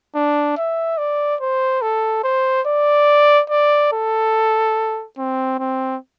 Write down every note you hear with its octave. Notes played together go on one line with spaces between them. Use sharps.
D4
E5
D5
C5
A4
C5
D5
D5
A4
C4
C4